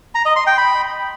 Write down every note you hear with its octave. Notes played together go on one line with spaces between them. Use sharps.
A#5
D#5
C6
G5
B5